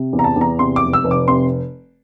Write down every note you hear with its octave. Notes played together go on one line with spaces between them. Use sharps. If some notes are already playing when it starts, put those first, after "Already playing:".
Already playing: C3
E2
A#5
A5
E2 A#5
C3 C6
D6
F1
E6
F1
D6
C3 C6